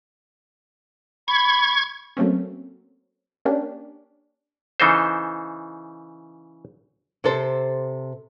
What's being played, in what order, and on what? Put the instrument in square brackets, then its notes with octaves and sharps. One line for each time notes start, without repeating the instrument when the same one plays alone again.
[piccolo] B5 [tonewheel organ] C#6 G#6
[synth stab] F#3 A3 A#3 C4 C#4
A#3 C#4 D4 G4
[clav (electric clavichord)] C#3 E3 D#4 A4 C5
[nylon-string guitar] C3 G4 A4 C5